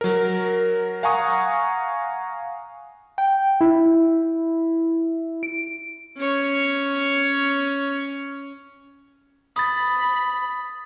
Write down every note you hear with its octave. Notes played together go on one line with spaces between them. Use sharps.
F#3 A#4
F5 F#5 G#5 A#5 C#6 D#6
G5
E4
D7
C#4 C#5
B5 D#6 A6